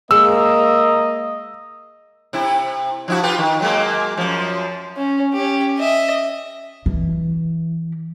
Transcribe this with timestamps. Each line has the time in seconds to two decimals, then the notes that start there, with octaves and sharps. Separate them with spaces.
0.11 G#3 A#3 D#5 E6
2.33 C3 E4
3.08 F3 E4 F#4
3.23 F4 G4 B4
3.38 D#3
3.60 F#3 G#3 A#3
4.18 F#2 F3
4.97 C#4
5.33 C#4 G4
5.79 D#5 E5
6.86 E3